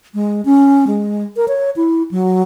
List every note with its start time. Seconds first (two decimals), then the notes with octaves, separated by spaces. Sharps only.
0.14 G#3
0.45 C#4
0.87 G#3
1.37 A#4
1.48 C#5
1.76 E4
2.11 F#3